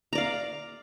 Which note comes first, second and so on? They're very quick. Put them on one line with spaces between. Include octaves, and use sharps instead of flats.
A#5 D5 F5